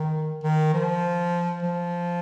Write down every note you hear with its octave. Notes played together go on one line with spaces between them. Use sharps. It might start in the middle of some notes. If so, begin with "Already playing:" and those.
Already playing: D#3
D#3
F3
F3